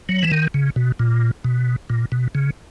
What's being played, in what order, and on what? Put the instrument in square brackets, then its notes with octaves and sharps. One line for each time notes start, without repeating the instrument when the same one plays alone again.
[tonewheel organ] F#3
E3
D#3
C#3
B2
A#2
B2
A#2
B2
C#3